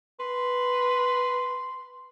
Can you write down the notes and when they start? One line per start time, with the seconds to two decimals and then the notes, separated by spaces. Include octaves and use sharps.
0.20 B4 C6